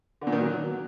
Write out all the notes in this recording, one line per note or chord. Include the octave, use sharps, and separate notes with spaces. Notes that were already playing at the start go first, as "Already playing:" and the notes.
D3
A#2
D#3
F#3